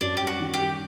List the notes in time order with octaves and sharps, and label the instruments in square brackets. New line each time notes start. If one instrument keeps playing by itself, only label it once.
[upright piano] F#2 [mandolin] D4
[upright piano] G3 [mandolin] G4
[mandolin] F#4
[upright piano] D#3
[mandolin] G4
[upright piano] G3